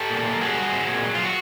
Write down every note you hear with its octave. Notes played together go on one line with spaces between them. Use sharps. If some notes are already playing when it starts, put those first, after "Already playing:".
Already playing: G4 A4
A#2
A#3
G3 F#4 G#4
G3
C4
A#2
F#3
F4
F#4